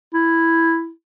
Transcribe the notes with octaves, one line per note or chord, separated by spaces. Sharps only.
E4